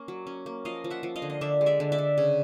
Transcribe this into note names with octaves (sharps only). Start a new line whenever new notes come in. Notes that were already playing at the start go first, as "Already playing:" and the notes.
Already playing: A#3 C#4
F#3
C#4
A#3
F3 D#5 F5
F3
E5 F#5
F3
D#5 F5
D3
D#5
D3 D5 E5
G#3
D5 E5
D3
D5 E5
D3
C#3